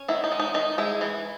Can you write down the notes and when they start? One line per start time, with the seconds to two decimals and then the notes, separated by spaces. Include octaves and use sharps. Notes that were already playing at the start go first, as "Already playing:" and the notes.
Already playing: C#4
0.08 D#3 E4
0.24 D#4
0.32 G#3
0.40 D#4
0.54 D#3 D#4
0.78 G#3 E4
1.01 E3